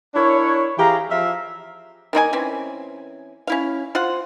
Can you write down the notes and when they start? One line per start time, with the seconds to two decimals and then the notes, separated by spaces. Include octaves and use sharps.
0.15 D4 E4 A#4 C#5
0.79 E3 G4 G#4 F5 A#5
1.10 F3 E5 F5
2.13 D#3 A#3 E4 G#5
2.33 E3 C4 C#4
3.47 C#4 E4 F5
3.95 F4 C5 F#5